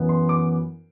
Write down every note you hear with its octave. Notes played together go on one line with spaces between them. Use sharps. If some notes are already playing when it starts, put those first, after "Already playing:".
Already playing: F#2 E3 B3
C6
D6